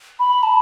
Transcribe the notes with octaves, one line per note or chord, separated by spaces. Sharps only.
B5
A5